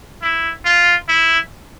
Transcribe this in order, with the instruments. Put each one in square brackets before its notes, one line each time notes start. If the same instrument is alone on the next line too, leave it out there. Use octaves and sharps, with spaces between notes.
[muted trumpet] E4
F4
E4